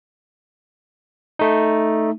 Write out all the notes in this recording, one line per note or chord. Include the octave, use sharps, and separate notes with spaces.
A3 D#4